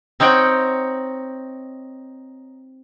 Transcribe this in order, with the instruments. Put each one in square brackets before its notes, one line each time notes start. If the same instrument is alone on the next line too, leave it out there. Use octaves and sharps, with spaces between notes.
[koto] C4 D#4 C#5 F#5 G5